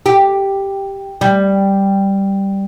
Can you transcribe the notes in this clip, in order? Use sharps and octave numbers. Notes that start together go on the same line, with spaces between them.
G4
G3